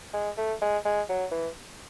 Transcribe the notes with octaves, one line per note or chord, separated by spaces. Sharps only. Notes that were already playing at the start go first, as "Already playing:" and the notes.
G#3
A3
G#3
G#3
F#3
E3